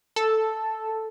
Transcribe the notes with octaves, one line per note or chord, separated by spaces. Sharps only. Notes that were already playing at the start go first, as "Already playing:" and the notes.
A4